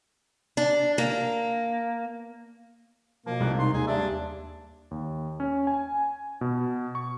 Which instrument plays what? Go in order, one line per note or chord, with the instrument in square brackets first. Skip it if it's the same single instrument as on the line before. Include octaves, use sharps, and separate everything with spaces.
[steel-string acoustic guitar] D4
A#3
[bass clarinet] B2 [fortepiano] F3 [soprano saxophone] A#3
[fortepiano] C2 G#2 F#6
[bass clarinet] D#4 [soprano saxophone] C6
[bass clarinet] D#2 [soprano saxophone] G#4
[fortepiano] G2 E5 [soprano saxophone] D4
[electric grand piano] D#2
C#4
G#5
B2
C#6